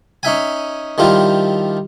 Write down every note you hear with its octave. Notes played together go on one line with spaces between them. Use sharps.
C#4 D#4 E5 G#5
D#3 F3 G3 E4 F4